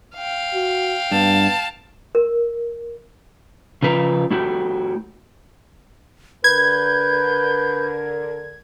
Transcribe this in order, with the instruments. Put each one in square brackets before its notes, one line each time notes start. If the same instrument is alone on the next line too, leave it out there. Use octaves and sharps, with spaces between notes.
[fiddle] F5 G5
[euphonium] F#4
[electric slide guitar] G2 [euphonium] B3 [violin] A5
[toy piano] A#4
[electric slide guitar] C#3 F3 B4 A#5
A3 E4 F#4 G4
[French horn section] D3 A#4 [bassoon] B4 [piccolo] G6 [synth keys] G#6